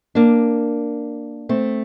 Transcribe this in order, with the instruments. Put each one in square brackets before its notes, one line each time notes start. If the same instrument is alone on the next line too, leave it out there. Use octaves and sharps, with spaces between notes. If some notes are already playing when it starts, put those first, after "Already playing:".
[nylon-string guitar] A#3 D4
A3 C4